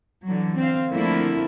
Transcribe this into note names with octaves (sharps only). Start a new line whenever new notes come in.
D3 E3 F#3
C4 F5
D3 F3 A3 A#3 C4 E4